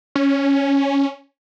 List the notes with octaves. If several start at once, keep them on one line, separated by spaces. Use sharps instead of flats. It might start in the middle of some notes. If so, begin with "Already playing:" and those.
C#4